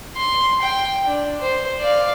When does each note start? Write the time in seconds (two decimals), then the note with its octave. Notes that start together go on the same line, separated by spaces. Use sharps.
0.17 C6
0.62 G5
1.07 D4
1.40 C5
1.79 D5 F5